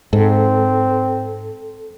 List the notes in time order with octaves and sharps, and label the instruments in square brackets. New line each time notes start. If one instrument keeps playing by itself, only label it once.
[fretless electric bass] G#2 [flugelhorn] C4 [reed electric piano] A4